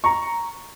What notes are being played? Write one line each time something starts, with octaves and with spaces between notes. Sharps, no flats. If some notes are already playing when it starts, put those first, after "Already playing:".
A#5 C#6